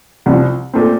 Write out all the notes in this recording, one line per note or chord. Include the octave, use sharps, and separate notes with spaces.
C2 C3 F3
A#2 A3 C4